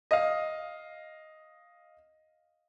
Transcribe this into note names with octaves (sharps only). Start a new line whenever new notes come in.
D#5 F5